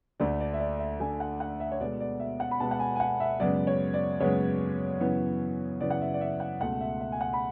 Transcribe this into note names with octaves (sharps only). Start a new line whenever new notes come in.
D2 D3 A3 D5
D5
E5
D5
E5
D2 D3 A3 G#5
F#5
F#5
E5
C#5
B2 G#3 B3 D5
D5
E5
F#5
B5
B2 G#3 B3 A5
F#5
G#5
G#5
F#5
E5
F#2 C#3 G#3 B3 D5
C#5
D5
F#2 C#3 G#3 B3 C#5
F#2 C#3 E3 B3
F#2 C#3 E3 B3 D5
F#5
E5
D5
E5
F#5
C#2 B2 A3 F#5
E5
E5
G#5
F#5
B5